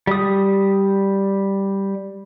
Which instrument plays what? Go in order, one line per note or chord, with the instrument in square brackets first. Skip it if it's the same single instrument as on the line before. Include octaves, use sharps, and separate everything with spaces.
[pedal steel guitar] G3 D#6